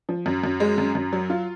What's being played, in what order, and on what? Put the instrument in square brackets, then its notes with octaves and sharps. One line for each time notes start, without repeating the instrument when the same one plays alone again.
[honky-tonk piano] F3
F#2
F#2
G#3
F#2
F#2
F#3
F4